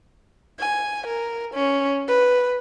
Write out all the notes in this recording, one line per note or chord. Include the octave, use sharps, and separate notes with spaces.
G#5
A#4
C#4
B4